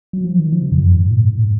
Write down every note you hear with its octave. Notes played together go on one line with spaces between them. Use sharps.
F#3
F3
D#3
F3
C#3
F2
F#2
G#2
A#2
G#2